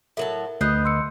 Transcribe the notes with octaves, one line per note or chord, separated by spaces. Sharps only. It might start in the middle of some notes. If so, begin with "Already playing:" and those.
A2 F#3 A#4 E5 A5
D2 B3 D#5 F#6 G6 C7
C6 E6 C#7